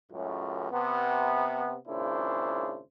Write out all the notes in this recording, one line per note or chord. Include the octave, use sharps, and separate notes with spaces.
C#2 F#2 A2
C3 B3
G#1 A#2 C#3 D4 E4 C5